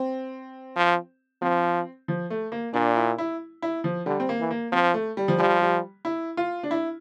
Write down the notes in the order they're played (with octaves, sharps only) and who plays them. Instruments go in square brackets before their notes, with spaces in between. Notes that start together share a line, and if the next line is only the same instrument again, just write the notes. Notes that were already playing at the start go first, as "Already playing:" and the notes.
Already playing: [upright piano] C4
[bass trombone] F3
[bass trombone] F3 [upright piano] C4
[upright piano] F3
A3
A#3
[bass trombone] A#2 [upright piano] D4
[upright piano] E4
E4
E4
F3
[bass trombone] D3 [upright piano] G3
[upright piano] C4
A#3
[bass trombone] E3
[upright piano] A#3
[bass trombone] F3 [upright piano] C4
[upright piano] A3
G3
F3
[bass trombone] F3 [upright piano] G3
[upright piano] G3
E4
F4
D4
E4